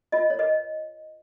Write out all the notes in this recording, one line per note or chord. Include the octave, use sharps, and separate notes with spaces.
F4 D#5
C#5
B4 D#5